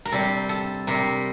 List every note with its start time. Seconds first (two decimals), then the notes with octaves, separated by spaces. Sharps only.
0.05 A#4
0.12 C3 G3 A4
0.49 A4
0.87 C3 G3 A#4